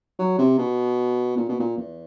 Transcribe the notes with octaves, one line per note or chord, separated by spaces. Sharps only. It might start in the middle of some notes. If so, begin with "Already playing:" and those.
F#3
C3
B2
A#2
B2
A#2
E2